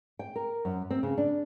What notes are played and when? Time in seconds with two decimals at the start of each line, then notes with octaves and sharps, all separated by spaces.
0.19 G5
0.36 A#4
0.65 F#2
0.90 C4
1.03 C#3
1.18 D4